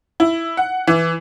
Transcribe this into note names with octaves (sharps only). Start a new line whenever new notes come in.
E4
F#5
E3